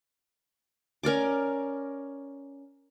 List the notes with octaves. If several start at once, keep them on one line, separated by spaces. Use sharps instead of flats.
C#4 A#4 D5 D6